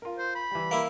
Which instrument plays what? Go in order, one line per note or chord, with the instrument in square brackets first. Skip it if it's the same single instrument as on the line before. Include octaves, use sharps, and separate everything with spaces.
[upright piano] F4 A#4
[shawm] C5
B5
[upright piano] E3 G3
[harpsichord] A#3 E4